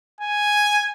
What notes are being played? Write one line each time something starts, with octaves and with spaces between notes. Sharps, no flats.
G#5